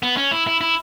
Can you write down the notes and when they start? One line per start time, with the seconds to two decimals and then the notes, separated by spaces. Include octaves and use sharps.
0.03 B3
0.17 C#4
0.31 E4
0.47 E4
0.61 E4